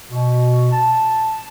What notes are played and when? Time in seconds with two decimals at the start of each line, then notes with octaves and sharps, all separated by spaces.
0.11 B2
0.71 A5